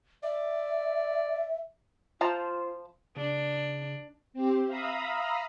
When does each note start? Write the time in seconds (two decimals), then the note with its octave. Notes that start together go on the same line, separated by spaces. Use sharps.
0.23 D5 E5
2.21 F3 F4 C5 A5 A#5
3.16 C#3 D4
4.33 C4 G4
4.67 E5 F5 A#5 B5 D#6